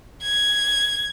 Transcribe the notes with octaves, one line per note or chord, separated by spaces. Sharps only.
G#6